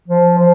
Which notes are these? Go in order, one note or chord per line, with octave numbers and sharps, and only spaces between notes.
F3
F3